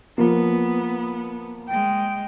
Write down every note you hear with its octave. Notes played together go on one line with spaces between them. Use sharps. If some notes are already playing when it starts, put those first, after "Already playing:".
F3 A#3 B3
G#3 G5